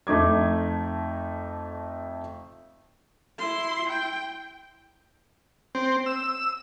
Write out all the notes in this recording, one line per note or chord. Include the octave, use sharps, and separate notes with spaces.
F2 A3 D#4 D6 G#6
E4 C6
G5
C4
E6